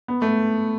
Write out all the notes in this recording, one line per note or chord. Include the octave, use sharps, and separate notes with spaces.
B3
A3